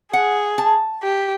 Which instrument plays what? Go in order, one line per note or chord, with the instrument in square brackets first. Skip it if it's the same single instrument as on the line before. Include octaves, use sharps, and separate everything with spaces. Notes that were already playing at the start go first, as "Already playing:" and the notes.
[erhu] G#4 [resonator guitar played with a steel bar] F#5
[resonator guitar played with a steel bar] A5
[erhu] G4